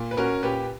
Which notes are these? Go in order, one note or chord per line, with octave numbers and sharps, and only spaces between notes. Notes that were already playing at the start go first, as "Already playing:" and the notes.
Already playing: A#2
B4
C#4 F#4 A#4
A#2 G4 B4